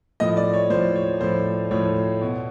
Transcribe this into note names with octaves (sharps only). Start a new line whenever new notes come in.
A2 F3 D#5
D5
C#5
A2 F3 C5
C#5
A2 F3 C5
A2 F3 C#5
B2